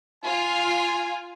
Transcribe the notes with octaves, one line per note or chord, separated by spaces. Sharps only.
F4 G#5